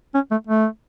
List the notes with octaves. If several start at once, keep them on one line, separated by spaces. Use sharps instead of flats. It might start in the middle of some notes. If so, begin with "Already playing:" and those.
C#4
A3
A3